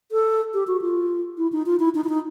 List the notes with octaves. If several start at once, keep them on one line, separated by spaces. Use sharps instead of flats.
A4
G4
F#4
F4
E4
D#4
F4
E4
D#4
E4
D#4